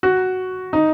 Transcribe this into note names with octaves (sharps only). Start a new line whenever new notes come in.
F#4
D#4